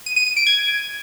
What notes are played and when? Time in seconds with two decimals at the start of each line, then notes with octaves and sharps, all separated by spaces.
0.06 D#7
0.16 D#7
0.26 D#7
0.36 D7
0.47 G#6